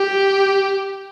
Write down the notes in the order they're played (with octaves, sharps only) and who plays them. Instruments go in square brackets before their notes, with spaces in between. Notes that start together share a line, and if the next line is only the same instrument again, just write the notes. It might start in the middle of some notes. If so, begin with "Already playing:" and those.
Already playing: [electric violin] G4